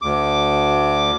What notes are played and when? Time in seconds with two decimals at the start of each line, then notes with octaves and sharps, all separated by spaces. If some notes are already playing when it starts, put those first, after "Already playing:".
0.02 D2 D6